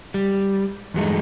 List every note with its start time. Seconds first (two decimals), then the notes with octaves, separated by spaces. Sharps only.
0.14 G3
0.94 E2 G2 F#3 G#3 A3 D#4